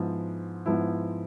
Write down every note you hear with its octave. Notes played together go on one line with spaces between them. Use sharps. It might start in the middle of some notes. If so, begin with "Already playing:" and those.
Already playing: G#2 F3 B3 E4
G#2 F3 B3 E4